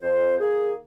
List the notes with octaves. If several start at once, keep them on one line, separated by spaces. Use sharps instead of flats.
F2 C5
D#3 A#3 G#4